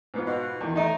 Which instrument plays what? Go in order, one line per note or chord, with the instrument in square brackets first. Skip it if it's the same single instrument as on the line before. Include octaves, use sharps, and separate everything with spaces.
[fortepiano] G#2 B3 F4
[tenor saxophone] B2
[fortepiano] E2 D#3
[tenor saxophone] A3 [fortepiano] D#4 D#5 A#5